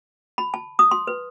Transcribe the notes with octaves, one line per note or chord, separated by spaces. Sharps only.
B5
A5
D#6
C6
B4